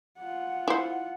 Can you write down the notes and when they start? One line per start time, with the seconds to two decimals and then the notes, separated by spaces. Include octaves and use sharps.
0.18 F4 F#5
0.68 E4 C5